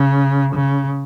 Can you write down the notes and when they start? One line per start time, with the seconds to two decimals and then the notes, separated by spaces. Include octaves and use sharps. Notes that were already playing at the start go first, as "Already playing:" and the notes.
Already playing: C#3
0.55 C#3